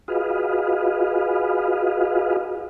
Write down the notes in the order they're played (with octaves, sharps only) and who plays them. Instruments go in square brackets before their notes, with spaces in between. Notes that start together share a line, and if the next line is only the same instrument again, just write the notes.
[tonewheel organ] F4 F#4 G#4 B4 D#5 F5